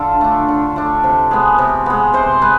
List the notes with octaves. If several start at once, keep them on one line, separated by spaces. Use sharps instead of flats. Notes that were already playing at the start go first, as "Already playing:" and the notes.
Already playing: D3 F4 A4
A3 D4
D3
A3 D4
C3
G#3 B3
C3
G#3 B3
C3 C5
G#3 B4